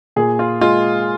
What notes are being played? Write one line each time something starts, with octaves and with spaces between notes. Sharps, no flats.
A#2 G#4
F4
G#3 F4